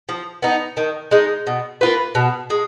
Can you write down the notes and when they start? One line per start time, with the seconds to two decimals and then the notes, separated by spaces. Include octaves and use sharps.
0.09 F3
0.42 B3 D#4
0.77 D#3
1.11 G#3 D#4
1.47 B2
1.81 A#3 F4 B4
2.15 B2
2.50 G#3